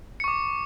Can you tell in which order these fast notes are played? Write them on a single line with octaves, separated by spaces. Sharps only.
C#7 C#6 D6